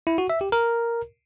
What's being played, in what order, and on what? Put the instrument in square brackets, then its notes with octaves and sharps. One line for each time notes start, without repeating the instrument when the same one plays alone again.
[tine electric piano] E4
F#4
E5
G4
A#4